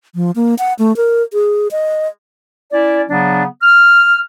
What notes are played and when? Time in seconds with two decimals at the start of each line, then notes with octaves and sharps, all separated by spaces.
0.15 F3
0.36 A#3
0.59 F#5
0.79 A3
0.97 A#4
1.33 G#4
1.71 D#5
2.72 C#4 E4 D5
3.09 C#3 F#3 B3 D4
3.62 F6